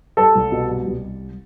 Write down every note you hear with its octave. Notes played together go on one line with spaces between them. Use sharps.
G3 A4 A5
C2
B2
G3
C2